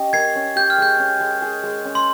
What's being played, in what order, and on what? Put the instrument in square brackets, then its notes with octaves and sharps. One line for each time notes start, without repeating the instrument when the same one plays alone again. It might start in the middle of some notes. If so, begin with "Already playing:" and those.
Already playing: [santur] C#4 G4 D#5
[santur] A#4 [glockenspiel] G#6 C7
[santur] C#4
[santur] G4 [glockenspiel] G6
[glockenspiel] F6
[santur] G#3 [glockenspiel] G6
[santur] C#4
G#3
G#4
G#3
C#4
[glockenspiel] C6